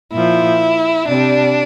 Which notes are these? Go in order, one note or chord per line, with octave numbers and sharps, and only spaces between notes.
A#2 F3 E4
C3 G3 D4